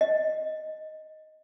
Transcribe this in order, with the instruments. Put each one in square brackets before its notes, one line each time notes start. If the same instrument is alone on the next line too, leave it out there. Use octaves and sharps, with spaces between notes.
[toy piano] D#5